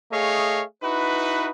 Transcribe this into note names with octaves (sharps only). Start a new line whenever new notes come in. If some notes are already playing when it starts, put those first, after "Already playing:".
A3 G#4 C#5 D#5 F5
D#4 E4 F#4 B4